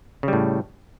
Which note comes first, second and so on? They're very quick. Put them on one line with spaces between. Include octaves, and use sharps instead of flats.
C#3 G3 A2